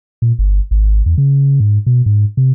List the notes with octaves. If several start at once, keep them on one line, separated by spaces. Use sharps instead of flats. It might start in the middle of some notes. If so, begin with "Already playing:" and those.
A#2
G1
G#1
E2
C#3
G#2
B2
G#2
C3